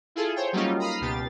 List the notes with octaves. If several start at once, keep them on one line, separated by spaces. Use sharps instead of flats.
E4 F4 G#4 A4
C5 C#5 G5
F#3 G3 A#3 C#4 D#4 F4
A#5 B5 D#6 F6 C7
C#2 B2 G4 A6